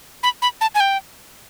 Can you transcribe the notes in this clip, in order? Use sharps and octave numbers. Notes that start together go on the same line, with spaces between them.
B5
B5
A5
G#5
G5